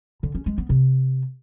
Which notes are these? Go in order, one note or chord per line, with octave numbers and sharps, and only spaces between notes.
D3
C#4
G#3
B3
C3